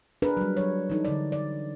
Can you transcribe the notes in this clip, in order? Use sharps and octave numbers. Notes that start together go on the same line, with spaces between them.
D4 G#4 A#4 B4
F#3 G3
F#3 C#5
E3 D#4 A4
D3 D5
D5